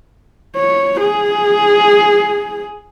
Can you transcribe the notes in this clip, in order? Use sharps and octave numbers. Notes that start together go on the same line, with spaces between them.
C#5
G#4